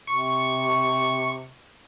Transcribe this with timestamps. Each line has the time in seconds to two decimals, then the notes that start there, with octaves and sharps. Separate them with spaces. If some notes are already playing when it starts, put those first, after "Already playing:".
0.07 C3 C#6